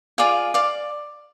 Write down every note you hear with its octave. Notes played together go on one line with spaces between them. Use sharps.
F4 G#4 D5 F5
D5 F5